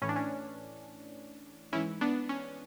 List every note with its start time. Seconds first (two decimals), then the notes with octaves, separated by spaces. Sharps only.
0.02 A2 E3 C#4
0.09 D4
0.16 C#4
1.72 G#2 E3 C#4 E4
2.01 B3 D4
2.29 C#4